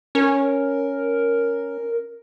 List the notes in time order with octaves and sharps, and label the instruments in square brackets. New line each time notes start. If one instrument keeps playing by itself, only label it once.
[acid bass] C#4 [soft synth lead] A#4